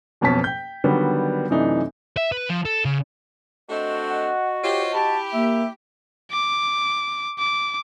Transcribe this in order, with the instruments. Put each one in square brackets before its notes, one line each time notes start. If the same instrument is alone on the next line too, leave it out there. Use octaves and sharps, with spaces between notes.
[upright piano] F#1 F2 B2 C#4 A5 B6
G5 G6
D3 D#3 F#3 G3 B3
F#2 C3 E3 A3 D4 D#4
[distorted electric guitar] E5
B4
F3
A4
C#3
[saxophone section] A3 C4 D4 [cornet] F#4 [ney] D#5
[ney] D#5 [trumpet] F#5
[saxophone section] F4 C5 C#5 [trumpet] G4
[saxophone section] E4 G4 [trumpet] A5
[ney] A#3 [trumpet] E5
[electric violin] D6
D6